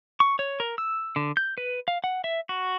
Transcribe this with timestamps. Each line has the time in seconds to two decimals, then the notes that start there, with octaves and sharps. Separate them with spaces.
0.20 C#6
0.39 C#5
0.60 A#4
0.78 E6
1.16 D3
1.37 G6
1.58 B4
1.88 F5
2.04 F#5
2.24 E5
2.49 F#4